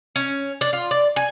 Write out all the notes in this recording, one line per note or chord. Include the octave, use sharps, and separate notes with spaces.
C#4
D4
F4
D5
G#5